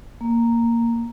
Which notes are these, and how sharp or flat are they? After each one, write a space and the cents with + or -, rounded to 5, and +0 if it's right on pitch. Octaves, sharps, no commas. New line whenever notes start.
A#3 -5